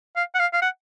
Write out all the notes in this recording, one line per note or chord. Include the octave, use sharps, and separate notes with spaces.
F5
F#5
F5
F5
F#5